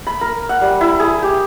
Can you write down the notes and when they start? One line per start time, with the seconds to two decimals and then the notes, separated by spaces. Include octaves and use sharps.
0.07 B5
0.21 A#4
0.49 F#5
0.61 G3
0.81 E4
1.00 G#4
1.22 G4